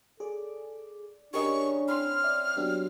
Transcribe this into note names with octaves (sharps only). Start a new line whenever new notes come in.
G#4 A4 D5
C#3 D4 G4 A#4 D#5 C#6
C4 E4 B5 C6 F6
D5 E5
F#3 B3 D4 G4